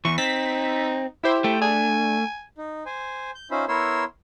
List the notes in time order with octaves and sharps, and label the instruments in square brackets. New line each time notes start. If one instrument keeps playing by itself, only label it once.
[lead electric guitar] E2 E3 [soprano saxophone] C#6
[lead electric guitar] C4 [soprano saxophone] D#4 [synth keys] E6 A6 B6
[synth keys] E4 G4 C5 [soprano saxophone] E5
[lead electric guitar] A3 [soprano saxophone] G5
[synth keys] D4 [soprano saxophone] G#5
[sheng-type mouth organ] D#4
C5 G#5
G6
C#4 D#4 F4 C5 E5 B5
B3 E4 A#4 C#5 C6 E6